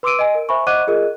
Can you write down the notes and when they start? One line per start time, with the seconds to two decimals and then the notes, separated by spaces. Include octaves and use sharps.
0.03 B4 C6 D6 E6 D7 D#7
0.19 D#5 G#5
0.35 A#4
0.49 C5 E5 G#5 B5 C#6
0.67 C5 D#5 F#5 D6 F#6 D#7
0.87 F4 G#4 A#4 D#5